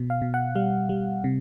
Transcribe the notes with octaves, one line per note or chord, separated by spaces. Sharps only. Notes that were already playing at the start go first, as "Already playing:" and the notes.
Already playing: B2
F5
B2
F#5
G3 F5
G3
C3